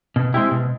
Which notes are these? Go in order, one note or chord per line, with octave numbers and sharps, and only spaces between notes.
B2
G#3 C4 E4 G4
B2